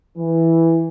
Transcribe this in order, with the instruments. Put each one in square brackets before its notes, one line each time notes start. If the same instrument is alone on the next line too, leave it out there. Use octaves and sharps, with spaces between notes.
[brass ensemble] E3